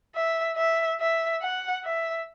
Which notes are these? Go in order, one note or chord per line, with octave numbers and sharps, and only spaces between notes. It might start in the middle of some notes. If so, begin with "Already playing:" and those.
E5
E5
E5
F#5
E5